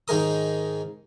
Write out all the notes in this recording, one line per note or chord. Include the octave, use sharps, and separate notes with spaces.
G#2 D#3 G#3 A#4 D#6